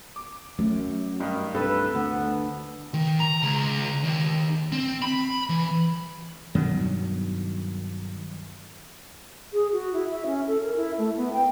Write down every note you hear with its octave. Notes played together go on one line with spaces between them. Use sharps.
D6
F#2 A3
G2 D#3
C2 G2 A4 B4 E6
D2 B3
D#3
A#5
C#2
D#2
C4
B5
E3
G2 B2 D#3 F#3
G#4
F#4
E4
E5
C#4
A4
A#4
E4
A3
B3
G5